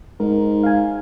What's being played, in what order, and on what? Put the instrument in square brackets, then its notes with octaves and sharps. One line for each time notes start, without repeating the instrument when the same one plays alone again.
[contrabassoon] G#2 [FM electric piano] D#4 A#4
[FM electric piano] F5 G#5